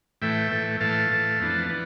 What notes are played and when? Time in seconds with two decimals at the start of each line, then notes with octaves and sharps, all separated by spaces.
0.22 A2 E3 A3 E5 G5
0.52 A2 E3 A3
0.80 A2 E3 A3 F5 A5
1.10 A2 E3 A3
1.40 F2 E3 B3 D4
1.69 E3 B3